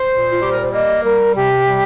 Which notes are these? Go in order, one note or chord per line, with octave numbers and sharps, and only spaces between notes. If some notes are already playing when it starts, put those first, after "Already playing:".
Already playing: C5
A#2
F4
G3 G4
A#4
C5
A#3 D#5
G3 A#4
C3 G4
G3